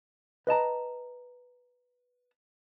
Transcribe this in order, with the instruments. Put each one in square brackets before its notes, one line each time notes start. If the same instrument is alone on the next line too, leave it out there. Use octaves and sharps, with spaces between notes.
[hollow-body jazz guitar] B4 D#5 A5 A#5